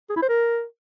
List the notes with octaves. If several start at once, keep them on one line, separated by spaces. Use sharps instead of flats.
G#4
E4
C5
A#4